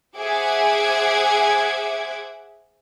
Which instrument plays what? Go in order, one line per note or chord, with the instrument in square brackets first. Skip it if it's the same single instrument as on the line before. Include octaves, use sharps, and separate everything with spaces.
[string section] G#4 C5 E5 F#5 D6 G#6